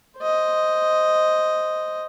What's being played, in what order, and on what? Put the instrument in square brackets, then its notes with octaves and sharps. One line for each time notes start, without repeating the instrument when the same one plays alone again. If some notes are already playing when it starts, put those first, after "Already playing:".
[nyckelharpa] C5 D#5